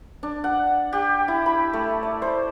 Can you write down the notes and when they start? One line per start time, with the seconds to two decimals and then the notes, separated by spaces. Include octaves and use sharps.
0.23 D4
0.44 F#5
0.93 G4
1.28 E4
1.46 B5
1.73 A3
2.03 D5
2.22 C5